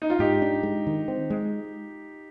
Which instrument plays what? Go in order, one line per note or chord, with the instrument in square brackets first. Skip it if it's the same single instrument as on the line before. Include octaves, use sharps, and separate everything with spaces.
[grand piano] D#4
F4
[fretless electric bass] G#2 [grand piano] D#4 G4
[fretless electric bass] D4
G#3
D#3
C4
G#3